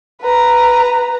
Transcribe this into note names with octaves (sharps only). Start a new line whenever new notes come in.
B4 A#5